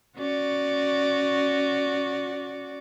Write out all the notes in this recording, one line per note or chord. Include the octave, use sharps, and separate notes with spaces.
C#4 F#4 D5